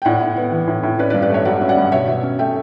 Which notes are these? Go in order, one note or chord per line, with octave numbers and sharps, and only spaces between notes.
G5
A2 D5 F#5
A2
B3
E3
A2
A2
C#4 B4 D5
B4 D5
G2
B4 D5
A3 C#5 E5
F#3 D5 F#5
C#4
D5 F#5
G2
B2 C#5 E5
B2
C#4
A3 E5 G5